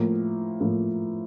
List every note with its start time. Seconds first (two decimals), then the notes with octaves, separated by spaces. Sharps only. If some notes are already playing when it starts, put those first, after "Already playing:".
Already playing: A2 F3 A#3
0.60 A2 F3 A#3